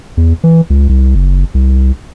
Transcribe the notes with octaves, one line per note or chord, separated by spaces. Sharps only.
E2
E3
C#2
C2
F#1
C2